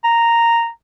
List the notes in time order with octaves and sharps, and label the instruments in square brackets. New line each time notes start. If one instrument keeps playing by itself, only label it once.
[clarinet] A#5